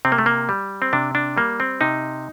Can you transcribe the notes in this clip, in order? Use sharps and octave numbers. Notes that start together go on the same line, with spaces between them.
C3 C4
A#3
A3
A#3
G3
C4
C3 D4
D4
G3 A#3
C4
C3 D#4